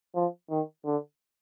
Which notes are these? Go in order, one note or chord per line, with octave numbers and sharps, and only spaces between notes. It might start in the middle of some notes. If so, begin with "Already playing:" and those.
F3
D#3
D3